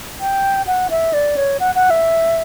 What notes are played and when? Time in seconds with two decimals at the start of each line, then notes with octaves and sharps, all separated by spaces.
0.20 G5
0.67 F#5
0.90 E5
1.13 D5
1.36 C#5
1.60 F#5
1.75 F#5
1.90 E5